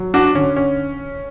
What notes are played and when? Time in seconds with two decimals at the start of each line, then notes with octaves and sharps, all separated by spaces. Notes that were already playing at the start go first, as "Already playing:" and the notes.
Already playing: F#3
0.14 D4 F#4
0.35 D3 C#4
0.56 C#4